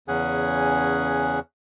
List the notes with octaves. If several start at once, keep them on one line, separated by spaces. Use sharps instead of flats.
E2 C#3 C#4 G#4 F#5 G#5